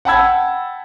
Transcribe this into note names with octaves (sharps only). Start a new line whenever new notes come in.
F#5 G5 A5 B5 E6 G#6